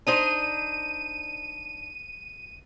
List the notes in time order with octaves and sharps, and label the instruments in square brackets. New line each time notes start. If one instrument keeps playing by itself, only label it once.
[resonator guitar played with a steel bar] D4 D#4 C5 [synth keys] D#7